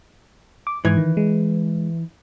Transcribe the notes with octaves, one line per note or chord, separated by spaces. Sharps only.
D6
G#2 E3 G#6
D#3
G#3